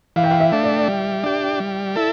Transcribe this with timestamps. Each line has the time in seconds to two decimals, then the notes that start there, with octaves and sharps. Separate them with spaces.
0.16 E3 F5
0.24 G5
0.31 F5
0.40 E5
0.52 A3 D4
0.64 D5
0.88 G3
1.24 D4 G4
1.60 G3
1.96 E4 A4